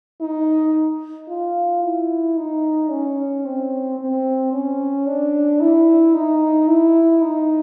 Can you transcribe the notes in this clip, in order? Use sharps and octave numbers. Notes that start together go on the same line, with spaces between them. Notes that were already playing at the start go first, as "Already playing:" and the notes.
D#4
F4
E4
D#4
C#4
C4
C4
C#4
D4
E4
D#4
E4
D#4